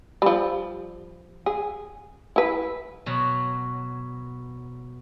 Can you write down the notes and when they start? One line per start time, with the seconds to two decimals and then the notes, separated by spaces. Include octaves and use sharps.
0.22 F3 G3
1.46 G#4
2.36 E4 B4
3.06 B2 F#3